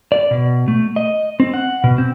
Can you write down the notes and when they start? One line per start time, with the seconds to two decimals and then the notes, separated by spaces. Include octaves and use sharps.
0.12 D5
0.31 B2
0.68 A3
0.96 D#5
1.40 C4
1.54 F#5
1.84 B2
1.98 C4